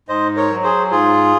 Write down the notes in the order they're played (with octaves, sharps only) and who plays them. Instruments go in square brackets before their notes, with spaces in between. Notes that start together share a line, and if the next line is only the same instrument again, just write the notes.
[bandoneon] G#2 C5 D#5
A#4 C#5
F#3
G#4 C5
G#2 F4 G#4